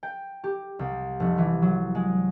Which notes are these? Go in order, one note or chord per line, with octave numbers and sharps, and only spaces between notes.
G5
G4
C2
F1
E3
F#3
G#3